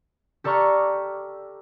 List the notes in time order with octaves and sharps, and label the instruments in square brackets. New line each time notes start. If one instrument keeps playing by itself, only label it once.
[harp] G4 A4 D5 A#5 C#6 F6